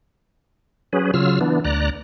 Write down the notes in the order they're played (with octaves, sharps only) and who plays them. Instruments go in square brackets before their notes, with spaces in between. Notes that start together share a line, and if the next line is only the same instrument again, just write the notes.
[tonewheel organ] F#3 C#4 G#4 B4
C#3 F#3 F4 E6 F6
E3 B3 D4
D2 D5 A#5 F#6